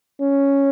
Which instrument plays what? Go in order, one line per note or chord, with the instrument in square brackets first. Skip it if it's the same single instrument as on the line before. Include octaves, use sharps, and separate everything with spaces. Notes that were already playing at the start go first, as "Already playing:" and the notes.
[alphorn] C#4